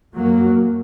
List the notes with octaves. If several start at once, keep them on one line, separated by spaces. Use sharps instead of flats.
F#2 F#3 A#3